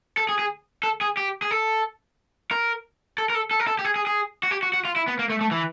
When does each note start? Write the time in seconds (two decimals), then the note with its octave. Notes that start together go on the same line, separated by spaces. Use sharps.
0.17 A4
0.29 G#4
0.39 G#4
0.83 A4
1.01 G#4
1.17 G4
1.42 G#4
1.51 A4
2.51 A#4
3.18 A4
3.30 A#4
3.35 A4
3.51 A4
3.60 A#4
3.67 A4
3.79 G4
3.85 G#4
3.96 G#4
4.07 G#4
4.43 F#4
4.51 G4
4.63 F#4
4.74 F#4
4.85 F4
4.96 E4
5.08 B3
5.19 A#3
5.30 A3
5.41 A3
5.51 E3